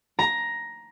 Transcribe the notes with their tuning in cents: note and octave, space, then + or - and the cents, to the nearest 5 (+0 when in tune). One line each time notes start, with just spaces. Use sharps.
A#5 +10